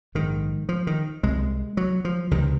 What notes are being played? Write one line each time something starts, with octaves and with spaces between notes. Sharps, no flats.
A#1 G#2 D#3
F3
D#3
C2 C3 G#3
F#3
F3
C#2 C3 D#3